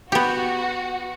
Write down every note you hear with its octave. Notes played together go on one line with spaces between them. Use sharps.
B3 F#4 G4